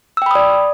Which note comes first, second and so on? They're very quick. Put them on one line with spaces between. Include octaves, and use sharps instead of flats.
E6 G5 B5 D#6 D5